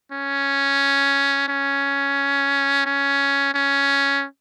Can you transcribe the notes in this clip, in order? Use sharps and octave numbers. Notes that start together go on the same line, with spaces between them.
C#4
C#4
C#4
C#4